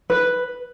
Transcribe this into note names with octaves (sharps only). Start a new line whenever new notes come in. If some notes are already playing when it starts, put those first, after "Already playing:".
B4